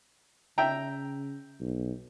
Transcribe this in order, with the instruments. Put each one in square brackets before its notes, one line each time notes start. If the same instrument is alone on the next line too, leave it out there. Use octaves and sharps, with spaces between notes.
[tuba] C#3 [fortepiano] E5 G5 A#5
[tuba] B1